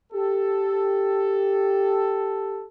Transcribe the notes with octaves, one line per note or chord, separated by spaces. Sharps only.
G4 A4